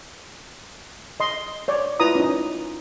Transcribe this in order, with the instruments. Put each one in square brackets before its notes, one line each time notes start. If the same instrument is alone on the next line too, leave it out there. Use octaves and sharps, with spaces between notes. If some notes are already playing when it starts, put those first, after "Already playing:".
[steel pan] D#5 C6
C#5 D5
E4 F4 B4 A#5 D#6
C#4 D#4